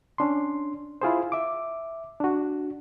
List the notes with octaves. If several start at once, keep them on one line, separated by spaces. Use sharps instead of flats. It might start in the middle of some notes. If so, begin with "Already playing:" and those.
C#4 D4 C6
E4 F4 G#4 C5
E5 D6
D4 F#4